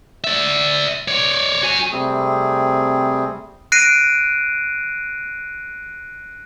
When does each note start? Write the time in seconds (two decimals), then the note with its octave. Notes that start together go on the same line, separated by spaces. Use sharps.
0.24 D5 E5
1.08 C#5 D5
1.63 F#4 G#5
1.91 C3 G3 A3 C4 G#4
3.72 F#6 A#6 C7 D7 D#7